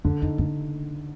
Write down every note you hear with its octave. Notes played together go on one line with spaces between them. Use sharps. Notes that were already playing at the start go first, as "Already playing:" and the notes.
F2 D3
F2 D#4
F#2 D3